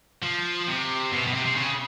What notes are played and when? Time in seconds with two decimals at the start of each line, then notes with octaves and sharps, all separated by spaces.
0.23 F3
0.68 C3
1.12 B2
1.27 B2
1.34 C3
1.46 C3
1.56 C#3